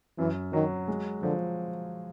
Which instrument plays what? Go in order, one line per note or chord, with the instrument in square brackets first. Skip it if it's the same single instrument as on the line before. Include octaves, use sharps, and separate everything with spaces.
[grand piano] F#2 [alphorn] E3
[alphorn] D#3 [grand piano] F#3
[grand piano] G#3
[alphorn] D3 [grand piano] F3